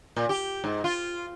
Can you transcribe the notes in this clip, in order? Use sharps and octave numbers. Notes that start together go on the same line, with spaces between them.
A#2
G4
G#2
F4